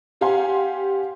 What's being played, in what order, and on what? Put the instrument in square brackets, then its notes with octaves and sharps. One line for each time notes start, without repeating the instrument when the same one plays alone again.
[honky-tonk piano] C4 G4 F5 F#5 G#5 C6